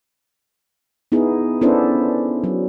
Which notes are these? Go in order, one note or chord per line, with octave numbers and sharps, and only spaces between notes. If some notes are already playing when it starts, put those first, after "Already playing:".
B3 D#4 E4 G#4
B3 C#4 D4 E4 A4 C5
F#3